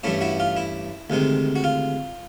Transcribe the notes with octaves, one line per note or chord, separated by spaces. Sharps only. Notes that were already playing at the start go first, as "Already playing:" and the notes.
G2 E3 A3 C#4 E4
E4 F#4
F4
E4
D2 C3 D#3 G#3
F#4
F4